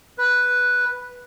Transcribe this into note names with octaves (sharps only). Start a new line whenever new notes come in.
B4